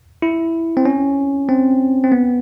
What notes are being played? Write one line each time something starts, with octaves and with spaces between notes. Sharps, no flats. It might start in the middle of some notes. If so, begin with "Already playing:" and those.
E4
C4
C#4
C4
C4
B3